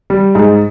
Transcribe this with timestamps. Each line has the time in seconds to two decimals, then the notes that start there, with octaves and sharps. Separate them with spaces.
0.10 G3
0.35 G#2